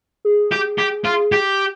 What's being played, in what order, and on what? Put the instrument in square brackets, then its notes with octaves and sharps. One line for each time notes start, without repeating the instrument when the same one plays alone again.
[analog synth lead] G#4
[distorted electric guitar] G4
G4
F4
G4